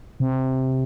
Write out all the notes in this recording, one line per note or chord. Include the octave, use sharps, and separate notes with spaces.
C3